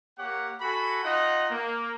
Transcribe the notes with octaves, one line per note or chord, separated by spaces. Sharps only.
A#3 G4 C#5 F#5
F#4 A4 G#5 B5
D#4 F4 D#5 F#5
A#3